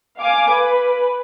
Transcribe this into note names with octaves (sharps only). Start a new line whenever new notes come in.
F5 G#5 D6
B4